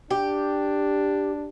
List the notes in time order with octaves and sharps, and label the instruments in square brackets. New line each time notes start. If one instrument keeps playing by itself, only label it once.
[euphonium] D4 [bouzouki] G4